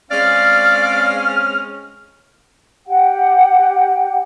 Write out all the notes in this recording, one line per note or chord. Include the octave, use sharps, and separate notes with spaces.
G#3 C4 C#4 D5 F5 F6
G4 F#5 G5